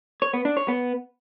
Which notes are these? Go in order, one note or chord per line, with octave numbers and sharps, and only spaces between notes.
C#5
B3
D4
C#5
B3